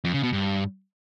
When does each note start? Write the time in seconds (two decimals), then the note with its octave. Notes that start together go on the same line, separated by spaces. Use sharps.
0.04 F2
0.14 C#3
0.23 B2
0.33 G2